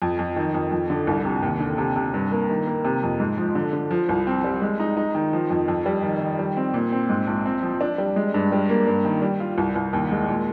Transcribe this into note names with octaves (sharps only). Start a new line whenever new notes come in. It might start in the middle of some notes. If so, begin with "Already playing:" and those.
F2
F2
D#3
F2
F2
D3
C2
C3
D#2
D3
C3
C3
G2
A#3
D#3
A#3
C3
F2
G#2
F3
D3
D3
F3
C2
C4
G3
G#3
D#4
D#4
D#3
F3
F2
F2
G3
D#3
D#3
G3
C4
A#2
C4
G#2
A#1
C4
F3
D4
G3
G#3
G2
G3
A#3
G2
D#3
G3
F4
C2
C2
D#2
G#3
A#2